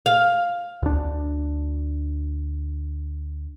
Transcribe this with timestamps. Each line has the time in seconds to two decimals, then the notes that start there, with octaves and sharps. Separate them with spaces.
0.06 F5
0.83 D2 D4